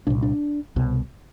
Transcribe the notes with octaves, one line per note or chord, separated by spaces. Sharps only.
C2 A#2 D4
D4
C2 B2